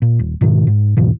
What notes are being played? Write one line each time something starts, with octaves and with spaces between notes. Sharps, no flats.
A#2
D#1
G#2 B2 D#3
G#2
D#2 G#2 B2 E3